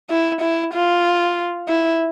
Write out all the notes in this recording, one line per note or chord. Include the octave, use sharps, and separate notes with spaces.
E4
E4
F4
E4